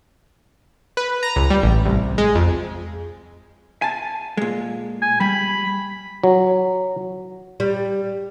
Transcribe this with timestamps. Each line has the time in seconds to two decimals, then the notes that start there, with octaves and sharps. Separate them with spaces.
0.97 B4
1.23 A#5
1.36 C#2
1.50 G3
1.63 A1
1.85 C2
2.18 G#3
2.35 F2
3.82 G#5 A5
4.37 A#2 G#3
5.02 G#5
5.20 G3 B5
6.24 F#3
7.60 G3